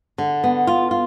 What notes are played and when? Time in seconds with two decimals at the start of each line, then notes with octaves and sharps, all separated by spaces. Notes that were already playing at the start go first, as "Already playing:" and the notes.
0.18 D3
0.44 B3
0.67 F4
0.91 F4